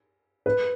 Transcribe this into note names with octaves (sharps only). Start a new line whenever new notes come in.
B4